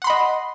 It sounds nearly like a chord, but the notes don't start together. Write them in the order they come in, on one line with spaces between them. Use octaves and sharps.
F#5 C6 B5 D#5